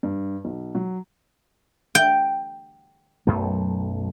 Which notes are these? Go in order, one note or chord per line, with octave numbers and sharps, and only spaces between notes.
G2
B1
F#3
G5
B1 F#2 A3